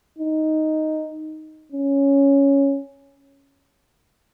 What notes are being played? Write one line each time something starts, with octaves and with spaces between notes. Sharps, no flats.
D#4
C#4